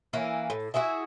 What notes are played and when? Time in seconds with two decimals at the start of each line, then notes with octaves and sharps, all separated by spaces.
0.13 E3 A#3 C#4 E4
0.50 A2
0.74 E4 F#4 G#4 E5